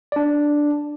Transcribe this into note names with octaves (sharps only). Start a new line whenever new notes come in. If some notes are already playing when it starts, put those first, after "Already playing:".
D4 D5